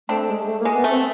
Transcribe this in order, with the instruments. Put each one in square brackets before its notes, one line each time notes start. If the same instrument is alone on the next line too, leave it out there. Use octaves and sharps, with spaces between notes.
[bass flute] A3 [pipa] C4 D4
[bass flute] G#3
A3
A#3
[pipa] G#3
[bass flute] B3
[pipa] A3 [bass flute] C4